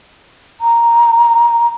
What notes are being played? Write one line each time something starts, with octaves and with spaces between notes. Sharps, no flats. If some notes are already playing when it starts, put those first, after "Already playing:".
A#5